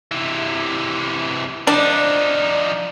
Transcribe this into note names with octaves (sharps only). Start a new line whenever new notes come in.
C3 E3
F3 D4 D#4